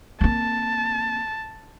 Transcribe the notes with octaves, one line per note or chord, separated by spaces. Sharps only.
A#3 C4 A5